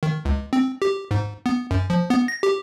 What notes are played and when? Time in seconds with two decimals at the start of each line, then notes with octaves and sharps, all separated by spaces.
0.03 D#3
0.25 C#2
0.53 C4
0.82 G4
1.11 G#2
1.46 B3
1.71 F#2
1.90 F3
2.10 B3
2.28 A#6
2.43 G4